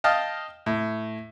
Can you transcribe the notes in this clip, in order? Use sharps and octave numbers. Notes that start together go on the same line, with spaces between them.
D#5 F5 G5 A5 D#6 F6
A2